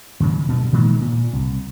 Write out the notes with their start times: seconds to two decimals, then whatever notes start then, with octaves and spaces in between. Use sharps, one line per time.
0.20 D#2 C#3 F#3
0.48 D2 G2 B2
0.72 A#2 D#3 G#3 A#3
1.01 A#2
1.33 C2